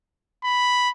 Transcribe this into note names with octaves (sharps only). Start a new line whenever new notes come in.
B5